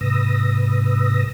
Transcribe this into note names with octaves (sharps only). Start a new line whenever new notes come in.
G#2 C3 B4 D#6 E6 A#6